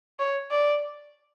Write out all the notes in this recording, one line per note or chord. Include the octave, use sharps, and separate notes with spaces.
C#5
D5